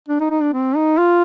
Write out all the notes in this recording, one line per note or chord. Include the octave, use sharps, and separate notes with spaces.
D4
D#4
D#4
D4
C4
D#4
F4